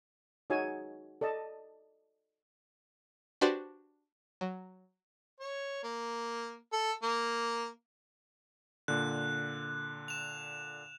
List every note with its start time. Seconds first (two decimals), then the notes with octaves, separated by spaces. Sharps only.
0.50 D#4 F#4 G#4 C#5 G#5 E6
1.21 A4 D5 D#5 A5
3.41 D4 F#4 G4 B4 C5 D5
4.41 F#3
5.40 C#5
5.84 A#3
6.73 A4
7.03 A#3
8.88 A#2 D3 F#6
10.08 E7 F7